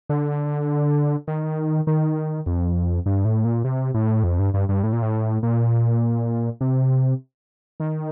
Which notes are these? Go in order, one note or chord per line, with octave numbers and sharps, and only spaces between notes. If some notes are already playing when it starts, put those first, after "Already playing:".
D3
D#3
D#3
F2
G2
A2
A#2
C3
A2
F2
G2
G2
G2
A2
A#2
A2
A#2
C3
D#3